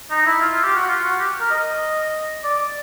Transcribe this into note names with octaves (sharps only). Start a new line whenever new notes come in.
D#4
E4
F4
G4
F#4
F4
F#4
G4
A#4
D#5
D5